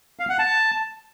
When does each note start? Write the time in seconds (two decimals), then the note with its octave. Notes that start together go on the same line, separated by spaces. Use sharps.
0.19 F5
0.29 F#5
0.39 A5